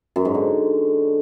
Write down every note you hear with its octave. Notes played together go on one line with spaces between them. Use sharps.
F#2
G#2
D3